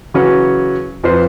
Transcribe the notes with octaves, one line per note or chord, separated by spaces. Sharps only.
C#3 E3 F#3 C#4
F2 F3 B4 C5